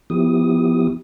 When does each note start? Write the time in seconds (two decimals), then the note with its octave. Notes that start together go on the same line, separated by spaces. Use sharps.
0.10 F3 B3 E4 G4 D#6